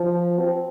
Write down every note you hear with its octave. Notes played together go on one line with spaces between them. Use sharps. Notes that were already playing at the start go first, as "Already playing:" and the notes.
Already playing: F3
C4